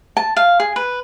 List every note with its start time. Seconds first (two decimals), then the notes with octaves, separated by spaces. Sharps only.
0.17 A5
0.36 F5
0.60 G#4
0.76 B4